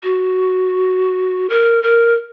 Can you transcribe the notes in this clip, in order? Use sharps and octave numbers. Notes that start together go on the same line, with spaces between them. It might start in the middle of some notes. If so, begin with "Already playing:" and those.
F#4
A#4
A#4